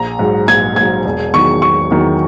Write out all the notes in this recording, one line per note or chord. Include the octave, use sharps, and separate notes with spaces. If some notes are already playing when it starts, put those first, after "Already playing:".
Already playing: A#1 A#5
G#2 F#3
A#1 G#6
G#2 F#3 G#6
E1
E2 D#3 F#3 C#6
E1 C#6
E2 D#3 F#3